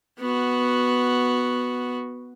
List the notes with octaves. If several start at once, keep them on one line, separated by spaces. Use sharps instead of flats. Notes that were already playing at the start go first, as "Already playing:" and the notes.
B3 F#4